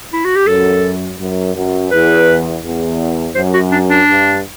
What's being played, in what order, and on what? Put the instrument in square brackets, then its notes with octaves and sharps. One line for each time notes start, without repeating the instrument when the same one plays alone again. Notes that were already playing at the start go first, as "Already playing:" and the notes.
[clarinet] E4
F#4
G4
[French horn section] F#2 [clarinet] A4
[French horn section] F#2
F#2
[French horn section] E2 [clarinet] B4
[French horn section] E2
[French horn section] F#2 [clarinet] C5
[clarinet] F#4
D4
D4
[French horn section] G2